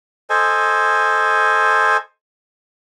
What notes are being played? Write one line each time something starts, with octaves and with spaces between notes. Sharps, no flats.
A4 C5 D#5 G#5